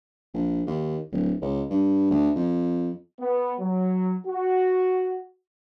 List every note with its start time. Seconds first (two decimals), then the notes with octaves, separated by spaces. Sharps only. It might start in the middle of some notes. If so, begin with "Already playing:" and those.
0.34 A#1
0.67 D#2
1.12 D1
1.42 C#2
1.70 G2
2.10 D2
2.35 F2
3.20 B3
3.60 F#3
4.27 F#4